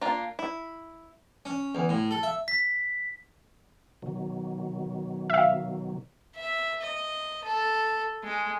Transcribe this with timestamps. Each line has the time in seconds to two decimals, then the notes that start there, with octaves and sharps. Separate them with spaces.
0.01 A#3 D4 F4
0.39 E4
1.45 C#4
1.75 E2
1.89 A2
2.11 A4
2.23 E5
2.48 B6
4.02 B2 D#3 F#3
5.30 E5 F5
6.36 E5
6.82 D#5
7.44 A4
8.24 G#3